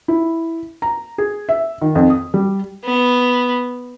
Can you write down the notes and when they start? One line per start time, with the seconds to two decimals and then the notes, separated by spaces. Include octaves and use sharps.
0.08 E4
0.82 A#5
1.18 G#4
1.49 E5
1.82 D#3
1.95 F2
2.10 D#6
2.34 G3
2.84 B3